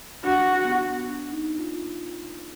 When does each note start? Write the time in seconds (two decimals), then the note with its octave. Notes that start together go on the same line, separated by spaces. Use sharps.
0.23 D4 F#4
0.65 B3
1.05 D4
1.31 D#4
1.59 F4